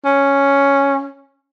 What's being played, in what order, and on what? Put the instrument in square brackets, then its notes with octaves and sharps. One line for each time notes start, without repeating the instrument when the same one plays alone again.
[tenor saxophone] C#4